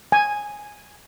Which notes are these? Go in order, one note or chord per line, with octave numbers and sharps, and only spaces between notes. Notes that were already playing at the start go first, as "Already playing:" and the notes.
G#5